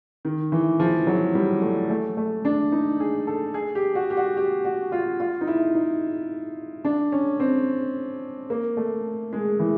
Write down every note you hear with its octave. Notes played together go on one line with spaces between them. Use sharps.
D#3
E3
F3
F#3
G3
A3
A3
A3
D4
D#4
G#4
A4
G#4
G4
F#4
G4
F#4
G4
F#4
F4
F4
D#4
E4
D#4
D4
C#4
C4
A#3
A3
G#3
E3